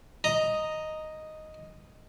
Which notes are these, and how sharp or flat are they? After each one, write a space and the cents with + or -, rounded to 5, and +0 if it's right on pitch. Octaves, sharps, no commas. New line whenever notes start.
D#5 +0 A#5 +0